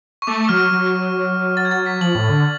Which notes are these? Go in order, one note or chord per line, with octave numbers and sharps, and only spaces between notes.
C#6
A3 D6
D6
F#3 F6
F#3
A6
G#6
A6
B6
F3 F#7
A2
D3